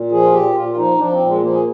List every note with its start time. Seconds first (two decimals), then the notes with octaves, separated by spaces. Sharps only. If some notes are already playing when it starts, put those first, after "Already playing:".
Already playing: A#2
0.11 F3 G#4
0.22 F4
0.33 A#2 G4
0.55 A#2 F4
0.69 F4
0.77 F3 D#4
0.98 F3 D4
1.12 C4
1.20 A#2
1.26 G#3
1.41 F3 A#3
1.53 G#4